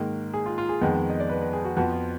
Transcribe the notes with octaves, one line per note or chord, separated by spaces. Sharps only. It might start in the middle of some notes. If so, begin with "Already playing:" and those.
Already playing: G#2 D#3 A#3
G#4
F4
F4
G#4
F2 D#3 G#3 B3
D#5
D5
B4
B4
G#4
F#4
F2 F3 B3 F#4
F4